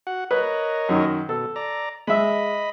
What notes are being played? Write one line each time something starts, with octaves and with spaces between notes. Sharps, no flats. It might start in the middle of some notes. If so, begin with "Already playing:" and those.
F#4 F#5
A#4 B4 C#5 D#5
F#2 D#3
B2 A4
D5 A#5
G#3 D#5 E5 B5